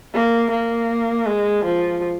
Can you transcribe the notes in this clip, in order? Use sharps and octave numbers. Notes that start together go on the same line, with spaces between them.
A#3
A#3
G#3
F3